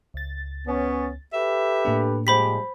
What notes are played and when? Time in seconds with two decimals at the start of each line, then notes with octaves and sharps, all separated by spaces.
0.14 C#2 A6
0.67 B3 C#4
1.33 G4 A4 B4 E5
1.85 A2 A#3 D4
2.27 F3 G3 G#3 G4 C5 B5 B6